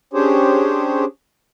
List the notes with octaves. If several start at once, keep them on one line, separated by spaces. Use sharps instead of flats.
C#4 D4 G4 G#4 C5 C#5